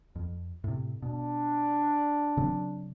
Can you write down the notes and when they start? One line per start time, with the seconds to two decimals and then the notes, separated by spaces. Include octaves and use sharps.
0.16 F2
0.64 A2 C3
1.02 B2 D4
2.37 C#3 F#3 C4